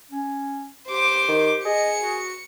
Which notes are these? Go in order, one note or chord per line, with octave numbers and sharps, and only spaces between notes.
C#4
G4 C5 D6
D#3
G#4 D#5 C#7
F#4